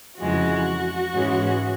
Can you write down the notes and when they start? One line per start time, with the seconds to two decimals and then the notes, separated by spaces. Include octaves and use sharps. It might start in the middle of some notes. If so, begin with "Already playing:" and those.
0.18 F2 C#3 E3 G#3 F#4
1.11 G#2 E3 G#3 C#4